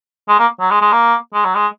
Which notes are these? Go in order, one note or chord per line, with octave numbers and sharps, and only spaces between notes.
G#3
A#3
F#3
G#3
G#3
A#3
G#3
F#3
G#3